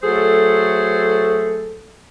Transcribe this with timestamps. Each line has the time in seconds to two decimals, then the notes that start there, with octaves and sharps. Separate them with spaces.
0.03 F#3 A3 G#4 A4 C5